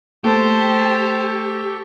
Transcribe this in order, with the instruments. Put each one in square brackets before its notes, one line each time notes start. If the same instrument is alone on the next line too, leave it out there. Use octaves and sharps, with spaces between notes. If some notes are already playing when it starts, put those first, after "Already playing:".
[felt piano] A3 [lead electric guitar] G4 [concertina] A4 C#6 [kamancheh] C5 A5